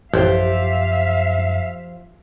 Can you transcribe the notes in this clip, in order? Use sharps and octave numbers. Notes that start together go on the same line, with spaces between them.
A1 F#2 F3 G4 C5 E5 F5